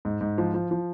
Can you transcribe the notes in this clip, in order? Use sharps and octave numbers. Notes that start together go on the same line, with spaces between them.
G#2
G#2
F3
F3
F3